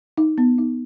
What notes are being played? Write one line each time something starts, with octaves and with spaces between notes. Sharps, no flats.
D#4
B3
D#4